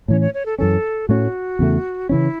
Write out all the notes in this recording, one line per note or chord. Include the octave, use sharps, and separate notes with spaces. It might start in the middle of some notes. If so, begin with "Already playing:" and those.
A2 E3 C#4 C#5
C#5
C#5
A4
F#2 E3 C#4 A4
A2 A3 C#4 F#4
E2 C#3 A3
C#3 E3 C#4 E4